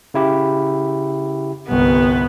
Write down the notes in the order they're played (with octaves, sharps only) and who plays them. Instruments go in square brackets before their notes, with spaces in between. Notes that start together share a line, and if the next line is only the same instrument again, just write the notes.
[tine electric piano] C#3 E4 G4
[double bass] G1 C2 [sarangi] B3